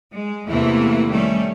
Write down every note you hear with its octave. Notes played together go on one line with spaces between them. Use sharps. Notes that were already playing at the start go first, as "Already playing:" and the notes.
G#3
E2 C3 E3 A3 A#3 E4
D#3 G3 A3 C#4